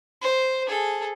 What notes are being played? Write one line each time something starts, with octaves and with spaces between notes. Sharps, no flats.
C5
G#4 A4